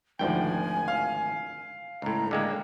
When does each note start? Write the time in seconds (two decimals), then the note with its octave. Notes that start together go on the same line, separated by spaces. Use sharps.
0.19 G#1 D2 D#3 F3 G5 G#5
0.88 F5
2.02 C#2 A2 A#5
2.31 D3 G#3 A#3 G5